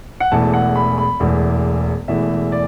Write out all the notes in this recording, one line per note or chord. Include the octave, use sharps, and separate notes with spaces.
F#5
E1 E2 E3 A3 A5
F#5
B5
B5
E1 E2 E3 A3
E1 E2 E3 A3 E5
D5